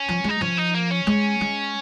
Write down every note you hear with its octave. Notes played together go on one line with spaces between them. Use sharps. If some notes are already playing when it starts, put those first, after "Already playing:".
Already playing: C#4
F3
G#3 D#4
F3 C#4
D#4
A#3
C#4
G#3
G#3